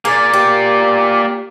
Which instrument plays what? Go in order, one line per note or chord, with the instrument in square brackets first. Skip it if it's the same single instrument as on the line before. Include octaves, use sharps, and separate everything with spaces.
[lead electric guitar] A#3 D5 [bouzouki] G#4
[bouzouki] G4